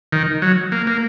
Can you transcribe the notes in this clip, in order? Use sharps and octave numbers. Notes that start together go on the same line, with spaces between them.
D#3
F#3
A#3
A#3